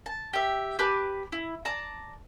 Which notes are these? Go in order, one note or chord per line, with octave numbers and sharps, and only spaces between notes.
A5
G4 E5
G4 B4 A5 D6
E4
D5 A5 A#5